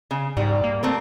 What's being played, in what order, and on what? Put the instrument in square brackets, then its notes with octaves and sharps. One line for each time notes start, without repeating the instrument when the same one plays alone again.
[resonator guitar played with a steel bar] C#3
[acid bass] G#2 [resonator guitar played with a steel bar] G3
[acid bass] A#3
[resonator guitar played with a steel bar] A3 C4 A#4